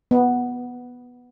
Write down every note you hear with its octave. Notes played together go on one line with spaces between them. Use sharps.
B3